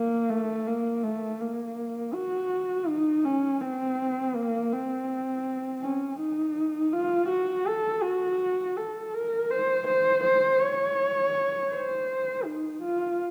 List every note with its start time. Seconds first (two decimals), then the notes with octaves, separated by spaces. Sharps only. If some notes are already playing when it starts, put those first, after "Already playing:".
Already playing: A#3
0.30 A3
0.67 A#3
1.03 A3
1.40 A#3
2.14 F#4
2.88 D#4
3.25 C#4
3.61 C4
4.35 A#3
4.72 C4
5.82 C#4
6.20 D#4
6.93 F4
7.29 F#4
7.67 A4
8.03 F#4
8.77 A4
9.14 A#4
9.50 C5
9.87 C5
10.24 C5
10.61 C#5
11.71 C5
12.45 D#4
12.82 F4